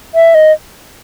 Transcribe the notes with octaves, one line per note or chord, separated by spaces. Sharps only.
E5
D#5